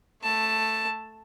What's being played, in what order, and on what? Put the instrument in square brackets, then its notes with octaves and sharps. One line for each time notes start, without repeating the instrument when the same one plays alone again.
[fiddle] A3 A5